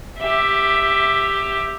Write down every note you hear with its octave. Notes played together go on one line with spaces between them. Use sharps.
G4 E5